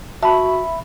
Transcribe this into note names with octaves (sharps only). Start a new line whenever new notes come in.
F#4 E5 A5 B5